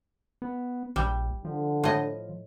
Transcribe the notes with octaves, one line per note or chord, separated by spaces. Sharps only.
B3
A#1 G3
D3 F3
A2 D#5